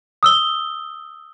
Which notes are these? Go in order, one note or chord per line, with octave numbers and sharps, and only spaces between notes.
D#6 E6 G7